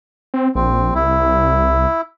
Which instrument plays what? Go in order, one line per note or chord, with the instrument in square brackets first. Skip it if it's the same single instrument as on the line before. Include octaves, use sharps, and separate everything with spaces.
[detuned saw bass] C4
[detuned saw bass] A#1 [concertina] C4
[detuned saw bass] C2 [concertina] E4